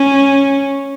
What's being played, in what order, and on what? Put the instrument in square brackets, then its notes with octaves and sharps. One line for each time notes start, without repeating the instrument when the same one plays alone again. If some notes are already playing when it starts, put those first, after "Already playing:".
Already playing: [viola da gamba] C#4